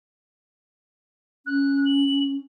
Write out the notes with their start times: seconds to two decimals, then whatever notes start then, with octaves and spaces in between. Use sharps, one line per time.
1.46 C#4 F#6
1.85 F#7